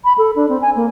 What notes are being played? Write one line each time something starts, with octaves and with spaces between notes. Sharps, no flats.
B5
A4
D4
C4
G#5
A#3